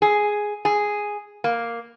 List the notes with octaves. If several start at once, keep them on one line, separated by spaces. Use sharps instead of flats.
G#4
G#4
A#3